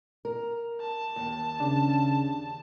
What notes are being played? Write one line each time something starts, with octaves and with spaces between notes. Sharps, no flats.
A#4
A5
D#2
C#3 D4